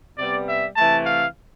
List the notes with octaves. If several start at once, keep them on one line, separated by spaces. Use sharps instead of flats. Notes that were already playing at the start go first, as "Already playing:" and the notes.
C3 G3 B3 D5
E5
C3 E3 A3 A5
F5